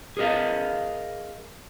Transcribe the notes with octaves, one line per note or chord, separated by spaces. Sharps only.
G#4 A#4 C5 D#5 F5